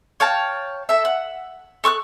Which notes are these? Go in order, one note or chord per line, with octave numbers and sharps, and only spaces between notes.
C#5 F5 G5 A5
A4 E5
F#5
A4 C#6 E6 F#6